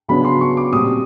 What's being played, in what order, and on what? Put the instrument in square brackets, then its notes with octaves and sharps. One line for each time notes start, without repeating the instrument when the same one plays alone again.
[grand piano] C#3 F#3 B3 D4 B5
C6
C#6
D6
A#2 G3 C4 D#6